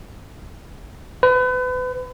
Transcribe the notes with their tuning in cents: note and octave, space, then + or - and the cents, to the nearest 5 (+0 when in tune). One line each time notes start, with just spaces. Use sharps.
B4 +35